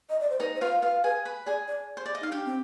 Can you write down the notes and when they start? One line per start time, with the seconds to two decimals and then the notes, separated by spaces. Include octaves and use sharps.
0.10 D#5
0.20 D5
0.30 C5
0.39 D#4 B4 D#5
0.56 C5
0.61 F4 B4 F5
0.82 F4 B4 F5
1.04 G#4 B4 G#5
1.25 B4 B5
1.46 G#4 D5 G#5
1.68 D5
1.97 C5
2.06 D5
2.15 D#5
2.21 D#4 F5
2.32 D4 G4 G5
2.45 C4